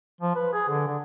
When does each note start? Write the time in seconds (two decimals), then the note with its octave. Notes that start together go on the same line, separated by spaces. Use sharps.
0.21 F3
0.35 B4
0.53 G#4
0.69 D3
0.87 D3